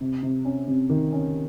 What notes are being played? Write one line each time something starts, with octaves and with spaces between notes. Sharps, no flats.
C3
C3
C#4
C3
D#3
C#4